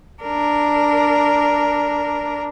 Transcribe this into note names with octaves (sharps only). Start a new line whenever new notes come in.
D4 A#4